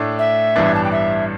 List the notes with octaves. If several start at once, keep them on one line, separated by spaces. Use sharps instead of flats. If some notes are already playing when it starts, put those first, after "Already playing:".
Already playing: A2 A3 D4
E5
A1 G2 E3 B3 D4
A5
G5
E5